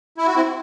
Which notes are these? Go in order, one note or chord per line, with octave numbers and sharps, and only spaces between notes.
E4
F#4
C4 E4